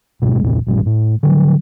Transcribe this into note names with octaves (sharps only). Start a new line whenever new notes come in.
D1 G#2 B2 G#3
B1 E2 A#2
A1 G2 A#2
A2
D3 F3 F#3